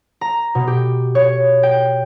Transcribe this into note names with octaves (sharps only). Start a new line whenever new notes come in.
A#5
B2
G4
C#5
G5